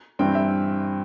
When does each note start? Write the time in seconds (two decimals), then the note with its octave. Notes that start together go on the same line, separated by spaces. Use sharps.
0.19 G2 E3 G3 C4 E4 G5
0.35 E5